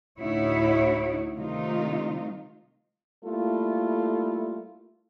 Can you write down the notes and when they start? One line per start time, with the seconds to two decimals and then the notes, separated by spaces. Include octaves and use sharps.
0.20 D2 A2 D#4 E4 F#4 C#5
1.37 C3 D#3 G3 A3 D#4 F4
3.24 G3 A3 A#3 E4 F4 A4